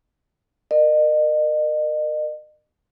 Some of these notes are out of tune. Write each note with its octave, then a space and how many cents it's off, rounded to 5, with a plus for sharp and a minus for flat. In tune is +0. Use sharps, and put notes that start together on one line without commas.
A#4 +0 D#5 -40